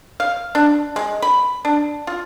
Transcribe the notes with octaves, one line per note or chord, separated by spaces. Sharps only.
F5
D4
G#3
B5
D4
F4